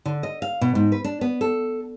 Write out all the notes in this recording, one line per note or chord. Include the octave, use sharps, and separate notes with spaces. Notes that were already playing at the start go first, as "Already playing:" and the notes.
D3
D#5
F5
B2
G#2
B4
D4
B3
A4